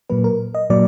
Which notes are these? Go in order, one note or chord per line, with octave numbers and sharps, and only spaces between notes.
A#2 F#3 A#3 B4
A#4
D#5
A#2 F#3 A#3 D5